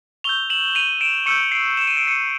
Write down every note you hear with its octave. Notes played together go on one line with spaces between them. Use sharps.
C#6 E6 G6 F7 G7
E7 F#7
D#7 F7
D7 E7
C#6 E6 G6 C#7 D#7
C7 D7
E7
D#7
D7
C#7 D#7